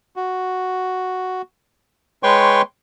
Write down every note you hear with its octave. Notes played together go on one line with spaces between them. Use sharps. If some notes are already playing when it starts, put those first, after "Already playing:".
F#4
G#3 B4 C#5 G5 C6 C#6